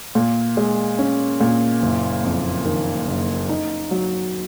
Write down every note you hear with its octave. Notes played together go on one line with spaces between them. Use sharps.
A#2
G#3
C#4
A#2
F#1
F2
D#3
F#1
D#4
F#3